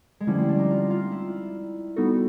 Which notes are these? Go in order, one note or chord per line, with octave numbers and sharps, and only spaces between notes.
G#3
D3 F3 G3 A3 C#4 E4
C4
D4
D#4
F4
F4
E4
G3 B3 D#4 F#4 A4